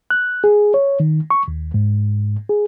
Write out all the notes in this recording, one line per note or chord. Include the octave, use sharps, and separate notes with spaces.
F#6
G#4
C#5
D#3
C#6
D#2
G#2
G#4